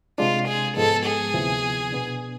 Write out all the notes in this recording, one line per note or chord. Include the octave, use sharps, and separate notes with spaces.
C3 G#3 D4 F4
G#4
G#2 F3 G#3 B3 A4
G#4
D2 C3 F3 B3 E4
B2 B3 D4